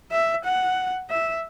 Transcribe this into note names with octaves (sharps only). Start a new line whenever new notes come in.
E5
F#5
E5